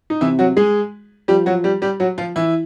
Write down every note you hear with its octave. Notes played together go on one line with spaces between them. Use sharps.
D#4
C3 E3 E4
F#3 F#4
G#3 G#4
F3 G3 G4
F#3 F#4
G3 G4
G3 G4
F#3 F#4
F3 F4
E3 E4